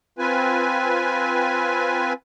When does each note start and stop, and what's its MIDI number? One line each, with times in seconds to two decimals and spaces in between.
0.19 2.13 60
0.19 2.13 65
0.19 2.13 71
0.19 2.13 80